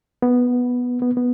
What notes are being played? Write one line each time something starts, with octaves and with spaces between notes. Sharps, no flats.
B3
B3
B3